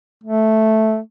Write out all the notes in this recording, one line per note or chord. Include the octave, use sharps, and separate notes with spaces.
A3